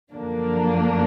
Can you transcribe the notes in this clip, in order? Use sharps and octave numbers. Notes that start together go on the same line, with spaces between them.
F#2 D3 F3 A#3 D4